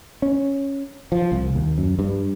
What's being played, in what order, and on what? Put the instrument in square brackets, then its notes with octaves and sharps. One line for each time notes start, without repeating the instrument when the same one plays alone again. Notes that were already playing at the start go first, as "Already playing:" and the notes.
[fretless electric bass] C#4
F3
C2
D#2
F#2
G2